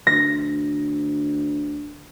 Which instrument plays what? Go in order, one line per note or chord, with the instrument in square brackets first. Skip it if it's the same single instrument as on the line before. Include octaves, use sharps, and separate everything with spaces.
[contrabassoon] D2 [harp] A#6